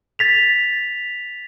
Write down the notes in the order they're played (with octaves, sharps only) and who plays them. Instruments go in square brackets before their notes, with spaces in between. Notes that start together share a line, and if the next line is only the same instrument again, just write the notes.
[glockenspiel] A6 B6 F7